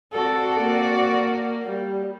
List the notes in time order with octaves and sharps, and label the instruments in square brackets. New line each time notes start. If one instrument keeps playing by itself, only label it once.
[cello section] C4 F#4 D5 [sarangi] A4
[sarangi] A#3
G3